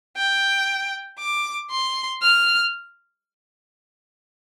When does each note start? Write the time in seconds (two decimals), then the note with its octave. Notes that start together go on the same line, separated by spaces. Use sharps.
0.17 G5
1.19 D6
1.71 C6
2.22 F6